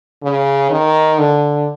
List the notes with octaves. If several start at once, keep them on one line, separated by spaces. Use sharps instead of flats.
C#3
D#3
D3